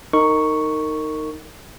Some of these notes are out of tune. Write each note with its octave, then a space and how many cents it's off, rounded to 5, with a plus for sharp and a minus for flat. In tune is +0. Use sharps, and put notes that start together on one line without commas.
D#4 +0 A#4 -25 C#6 +0